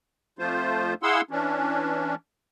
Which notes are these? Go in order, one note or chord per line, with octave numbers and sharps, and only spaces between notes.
F2 F3 A3 F4 C5
E4 G#4 F5 F#5 C6 E6
E3 C#4 D4